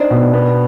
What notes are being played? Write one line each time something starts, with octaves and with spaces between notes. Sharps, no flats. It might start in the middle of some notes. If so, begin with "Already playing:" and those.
Already playing: C4 D4 D#4
B2
B3